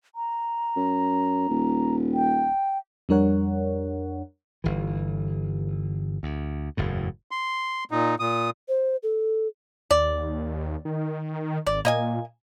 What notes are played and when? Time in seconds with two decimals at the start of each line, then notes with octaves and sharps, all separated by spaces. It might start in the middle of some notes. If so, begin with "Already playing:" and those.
0.15 A#5
0.76 F#2
1.49 D#1
2.14 G5
3.09 F2 G3 D4 A#4 C#5 F#5
4.64 G1 E3
6.23 D2
6.77 F#1 E2 A2
7.31 C6
7.91 A#2 D#4
8.20 A#2 D#6
8.68 C5
9.03 A4
9.91 D#2 D5
10.85 D#3
11.66 G#1 D5
11.85 A#2 A#3 D#5 G#5